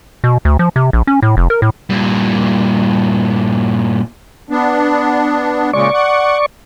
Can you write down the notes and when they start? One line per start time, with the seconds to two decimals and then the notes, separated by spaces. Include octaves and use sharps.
0.24 B2
0.45 D2
0.59 F3
0.76 C3
0.93 A#1
1.07 C#4
1.23 A2
1.37 F1
1.50 A#4
1.62 A2
1.90 G2 A#2
4.50 B3 D4
5.73 A#2 C#3 G#3 D5 C#6
5.94 F#5